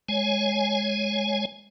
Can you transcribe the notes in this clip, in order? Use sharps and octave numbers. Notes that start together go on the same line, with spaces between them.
G#3 C#5 G#5